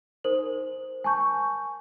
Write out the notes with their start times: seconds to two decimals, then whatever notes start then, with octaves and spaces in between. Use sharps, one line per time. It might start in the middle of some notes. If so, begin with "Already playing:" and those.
0.24 D#4 A#4 C5 F#7
1.04 G#5 A5 C#6 G6